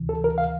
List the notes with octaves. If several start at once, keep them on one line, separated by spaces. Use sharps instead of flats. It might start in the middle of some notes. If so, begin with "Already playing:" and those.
Already playing: D2 C3 E3
A4
A#4
F5